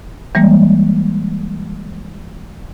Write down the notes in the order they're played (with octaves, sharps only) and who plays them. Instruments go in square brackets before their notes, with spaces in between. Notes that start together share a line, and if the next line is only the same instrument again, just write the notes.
[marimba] E3 G3 G#3 A#3